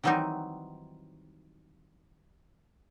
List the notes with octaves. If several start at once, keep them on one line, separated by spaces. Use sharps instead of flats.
D#3 E3 F#3 G3 C4 D#4